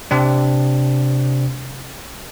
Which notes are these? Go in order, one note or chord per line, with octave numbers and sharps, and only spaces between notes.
C3 C4 D4